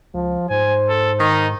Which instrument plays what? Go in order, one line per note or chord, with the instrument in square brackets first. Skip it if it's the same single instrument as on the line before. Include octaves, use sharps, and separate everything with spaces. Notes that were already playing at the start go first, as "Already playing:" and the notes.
[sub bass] C#2 [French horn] F3
[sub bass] G#2 [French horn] C5 [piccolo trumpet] G#5
[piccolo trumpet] A4
[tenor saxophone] D#3 [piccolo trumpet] D#4